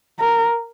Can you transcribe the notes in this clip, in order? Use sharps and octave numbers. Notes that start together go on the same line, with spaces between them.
A#4